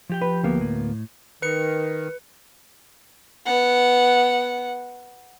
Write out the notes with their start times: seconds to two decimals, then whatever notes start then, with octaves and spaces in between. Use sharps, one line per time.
0.09 F3 G4 G5
0.22 B4
0.43 D2 A#3 B3
0.61 A2
1.42 D#3 B4 C#7
3.46 B3 F#5